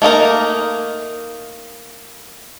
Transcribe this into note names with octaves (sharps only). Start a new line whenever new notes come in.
A3 A#3 D#4 A#4